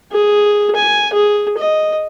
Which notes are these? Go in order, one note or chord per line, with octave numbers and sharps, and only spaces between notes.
G#4
G#5
G#4
D#5